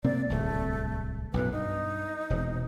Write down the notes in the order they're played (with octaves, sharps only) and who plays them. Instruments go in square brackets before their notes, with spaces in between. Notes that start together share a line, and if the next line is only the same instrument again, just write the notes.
[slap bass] C3 A#3 C4 [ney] D5
[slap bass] D1 C2 [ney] A3
[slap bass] B1 F#2 A2 [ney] B4
[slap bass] G2 [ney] D#4
[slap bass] E1 C3